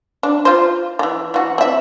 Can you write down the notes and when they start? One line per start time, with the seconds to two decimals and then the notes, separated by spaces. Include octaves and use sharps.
0.23 D4
0.45 F4 C5
0.99 D#3 E3
1.34 E3 F#4
1.58 C4 E5